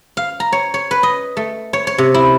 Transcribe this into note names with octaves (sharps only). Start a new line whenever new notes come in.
F5
A#5
C#5
C#5
B4
D#5
A3
C#5
C#5
C3
E4